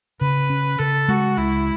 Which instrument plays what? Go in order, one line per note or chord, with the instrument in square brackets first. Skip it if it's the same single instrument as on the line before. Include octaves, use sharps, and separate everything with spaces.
[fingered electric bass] C#3 [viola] B4
[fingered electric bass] C#4
[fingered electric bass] C#3 [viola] A4
[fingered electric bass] G#3 [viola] F#4
[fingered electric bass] C#2 [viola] E4